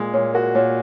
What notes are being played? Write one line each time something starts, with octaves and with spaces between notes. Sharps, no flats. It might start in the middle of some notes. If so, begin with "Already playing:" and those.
Already playing: A#2 G#3
A#2 C#5
F#4 A#4
A#2 C#5